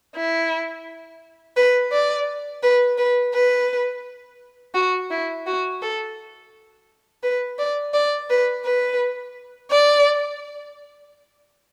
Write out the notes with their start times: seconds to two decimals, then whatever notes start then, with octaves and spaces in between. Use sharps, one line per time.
0.15 E4
1.57 B4
1.92 D5
2.62 B4
2.97 B4
3.34 B4
4.75 F#4
5.10 E4
5.46 F#4
5.81 A4
7.23 B4
7.58 D5
7.93 D5
8.30 B4
8.64 B4
9.71 D5